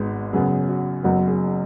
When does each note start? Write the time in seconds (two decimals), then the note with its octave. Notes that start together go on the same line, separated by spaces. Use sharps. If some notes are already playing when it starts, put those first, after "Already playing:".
Already playing: G#1 G#2 G#3 B3 B4
0.33 F#2 C#3 F#3 B3 G#4
0.69 F#4
1.03 F#1 F#2 F#3 B3 F#4
1.27 G#4